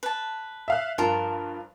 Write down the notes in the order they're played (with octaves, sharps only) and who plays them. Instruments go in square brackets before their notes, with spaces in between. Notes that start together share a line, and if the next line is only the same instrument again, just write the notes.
[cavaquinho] B4 A5
[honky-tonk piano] E5 F5 F#6
[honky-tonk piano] G2 F3 [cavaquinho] F4 A#4 A5